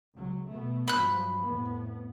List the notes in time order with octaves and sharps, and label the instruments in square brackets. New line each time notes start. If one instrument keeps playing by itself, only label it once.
[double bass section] C#2 F#3
B2 A3 B3
[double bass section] G2 F3 F#3 [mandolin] B5 F#6
[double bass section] F2 A2 B3